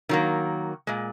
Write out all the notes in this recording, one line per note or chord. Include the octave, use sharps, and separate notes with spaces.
D#3 F#3 A#3
A#2 G#3